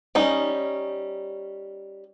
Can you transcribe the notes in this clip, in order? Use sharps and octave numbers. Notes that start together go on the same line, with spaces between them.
G3 C#4 D#4